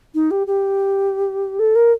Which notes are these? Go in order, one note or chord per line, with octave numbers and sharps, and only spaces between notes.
D#4
G4
G4
A4
A#4